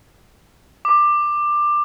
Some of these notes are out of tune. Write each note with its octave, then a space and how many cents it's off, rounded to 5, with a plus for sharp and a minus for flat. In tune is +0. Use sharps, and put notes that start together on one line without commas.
D6 +15